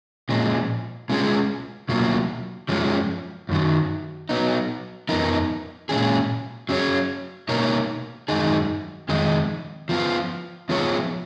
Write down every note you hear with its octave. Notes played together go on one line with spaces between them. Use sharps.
A#2 F3 G#3 C#4
B2 G#3 C#4 F4 G#4
B2 F#3 A#3 F4
F#2 F3 G#3 C#4
F#2 D#3 F#3
F#3 B3 D#4
F2 F3 B3 D#4 A#4
A#2 G#3 C#4 G#4
F#3 C#4 G#4 C#5
B2 A#3 D#4 A#4 C#5
F#2 D#3 G#3 D#4 G#4
F2 D#3 G#3 D#4
F3 B3 F4
F3 B3 F4 G#4 C#5